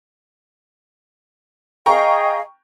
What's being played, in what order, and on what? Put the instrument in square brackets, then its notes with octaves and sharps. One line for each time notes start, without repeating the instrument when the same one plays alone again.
[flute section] G#4 D#5 F5 [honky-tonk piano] G5 A#5 C#6